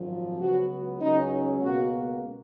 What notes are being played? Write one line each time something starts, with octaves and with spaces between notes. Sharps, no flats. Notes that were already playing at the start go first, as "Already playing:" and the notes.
Already playing: G#1 F#2 F3
C#2 C#3 F#3 B3 F#4
C#2 C#3 F#3 C#4 D#4
C#2 B2 A#3 F#4